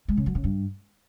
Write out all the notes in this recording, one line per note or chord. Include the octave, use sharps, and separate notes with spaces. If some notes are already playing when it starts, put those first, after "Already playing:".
G#3
C#3
F#3
C#3
G2